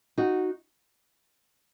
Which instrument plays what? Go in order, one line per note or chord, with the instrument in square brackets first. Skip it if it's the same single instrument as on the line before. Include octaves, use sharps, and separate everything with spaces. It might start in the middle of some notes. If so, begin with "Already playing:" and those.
[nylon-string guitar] D#4 F#4